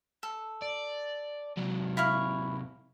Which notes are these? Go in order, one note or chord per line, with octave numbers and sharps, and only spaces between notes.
A4
D5
C3 F#3
E4 F5 C#6